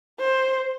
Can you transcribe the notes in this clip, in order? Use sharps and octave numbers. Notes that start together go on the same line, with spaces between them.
C5